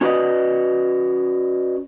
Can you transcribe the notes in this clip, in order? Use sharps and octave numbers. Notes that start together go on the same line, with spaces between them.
C#4 F#4 B4 D5 D#5